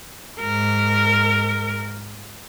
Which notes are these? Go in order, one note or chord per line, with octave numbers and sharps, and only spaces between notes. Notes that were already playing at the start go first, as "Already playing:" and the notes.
G#2 A#4